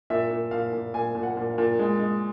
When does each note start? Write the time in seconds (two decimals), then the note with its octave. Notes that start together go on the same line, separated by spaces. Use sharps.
0.10 A#2 E5
0.31 A#2
0.51 A#2 F5
0.73 A#2
0.94 A#2 G#5
1.15 A#2
1.23 F#5
1.37 A#2
1.51 F5
1.58 A#2
1.79 G#3
2.00 G#3